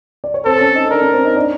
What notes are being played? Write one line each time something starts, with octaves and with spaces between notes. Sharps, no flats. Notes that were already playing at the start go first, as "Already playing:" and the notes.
D5
C#5
C4 A4 C5
C5
C#4 C#5
D#4 D#5
D4 A#4 D5
C#4 C#5
C4 C5
D#4 D#5
D4 D5